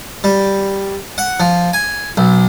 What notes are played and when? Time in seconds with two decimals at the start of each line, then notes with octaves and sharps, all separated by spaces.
0.24 G3
1.18 F#5
1.40 F3
1.73 G#5
2.17 B1